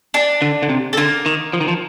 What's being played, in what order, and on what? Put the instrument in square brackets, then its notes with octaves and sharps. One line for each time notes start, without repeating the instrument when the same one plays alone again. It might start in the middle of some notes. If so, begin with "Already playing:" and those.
[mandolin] D4 D5
[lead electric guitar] D3
D3
C3
[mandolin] A4
[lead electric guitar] D3 [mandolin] A#3 A#4
[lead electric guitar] D#3
F3
D#3
F3